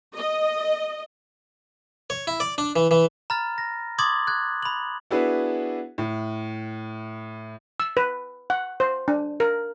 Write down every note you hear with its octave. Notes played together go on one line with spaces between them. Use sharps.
D#5
C#5
E4
D5
D4
E3
E3
A#5 B5 F6 A6
A#6
C6 D6 D#6 G#6 A6 F#7
F#6 G#6
B5 F#7
B3 D4 E4 F#4 G#4 B4
A2
E6
B4
F#5
C5
D4
A#4